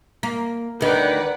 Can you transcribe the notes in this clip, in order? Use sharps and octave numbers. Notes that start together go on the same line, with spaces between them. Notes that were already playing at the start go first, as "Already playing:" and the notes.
A#3
D2 D#3 B4 D5 F#5